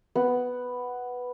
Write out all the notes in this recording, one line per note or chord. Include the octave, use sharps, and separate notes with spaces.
B3